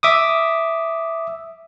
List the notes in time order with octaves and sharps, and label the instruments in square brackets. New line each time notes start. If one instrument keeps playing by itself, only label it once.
[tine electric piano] E5 D6 D#6